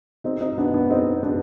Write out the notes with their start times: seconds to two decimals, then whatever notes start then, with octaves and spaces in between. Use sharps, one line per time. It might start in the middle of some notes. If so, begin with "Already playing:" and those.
0.24 C4 D#4
0.41 C4 D#4
0.58 B3 D4
0.74 B3 D4
0.90 C4 D#4
1.23 B3 D4